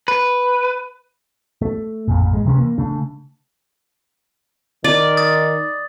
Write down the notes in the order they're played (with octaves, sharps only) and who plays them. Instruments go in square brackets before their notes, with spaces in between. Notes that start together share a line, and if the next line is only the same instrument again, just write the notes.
[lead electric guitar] B4
[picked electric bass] A3
A1 F2 A#2
G#3
C3 E3 C#4
A#3
C#3 A3 D4
[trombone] D#3 [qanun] D5
[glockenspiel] D#6 A6